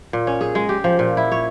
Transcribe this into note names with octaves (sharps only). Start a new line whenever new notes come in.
A#2
C#4
G#4
G#3
G4
F3
A#2
E4
C#5